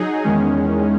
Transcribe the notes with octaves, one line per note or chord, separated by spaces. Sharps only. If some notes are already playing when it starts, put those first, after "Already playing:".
Already playing: F#3 D#4 G#4
E2 D#3 G#3 C#4